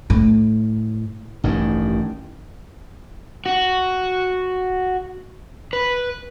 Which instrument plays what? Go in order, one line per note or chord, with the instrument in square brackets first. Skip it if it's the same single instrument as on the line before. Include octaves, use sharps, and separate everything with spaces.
[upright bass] A2
[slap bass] A1 G2 D#3
[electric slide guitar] F#4
B4